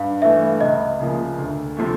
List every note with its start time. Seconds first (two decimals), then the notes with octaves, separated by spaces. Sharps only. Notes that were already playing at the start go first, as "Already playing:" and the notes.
Already playing: G2 F5
0.22 E3 A3 E5
0.61 C#2 D#5
1.00 C#3 F3 A#3
1.38 D2
1.77 C3 F3 A3